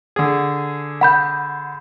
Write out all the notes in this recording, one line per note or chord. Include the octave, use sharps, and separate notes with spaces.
D3 G#4
F#5 B5 G6